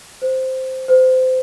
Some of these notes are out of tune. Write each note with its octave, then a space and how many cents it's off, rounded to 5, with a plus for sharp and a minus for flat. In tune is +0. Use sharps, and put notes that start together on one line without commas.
C5 -5
C5 -25